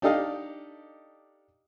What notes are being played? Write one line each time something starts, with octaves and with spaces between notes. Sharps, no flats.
D4 D#4 G4 A4 D#5 F5